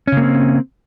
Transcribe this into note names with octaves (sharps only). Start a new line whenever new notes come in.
C#3 A#3 C4 C#4